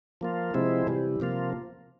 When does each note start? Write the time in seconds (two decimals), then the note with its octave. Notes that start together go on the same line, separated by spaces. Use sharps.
0.21 F3 A#3 F4
0.54 C3 F3 G#3 C4 E4
0.87 C3 E3 G3
1.20 C3 F3 A#3 F4